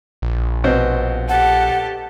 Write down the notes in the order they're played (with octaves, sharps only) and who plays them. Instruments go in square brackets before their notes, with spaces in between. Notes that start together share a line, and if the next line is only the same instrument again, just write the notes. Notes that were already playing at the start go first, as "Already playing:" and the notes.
[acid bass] A#1
[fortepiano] B2 C4
[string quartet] G4 A4 [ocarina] F#5